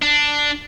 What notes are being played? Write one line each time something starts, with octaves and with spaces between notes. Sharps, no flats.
D4